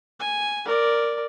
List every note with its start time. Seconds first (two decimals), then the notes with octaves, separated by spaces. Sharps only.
0.20 G#5
0.65 A#4 D5